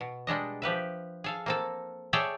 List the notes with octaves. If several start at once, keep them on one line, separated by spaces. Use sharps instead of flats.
B2
G3 G#3 D4 D#5
F3 G4 B4 E5
G#4 A4 F5
A#3 C4 A4
G#4 A4 C#5 D5 E5 G5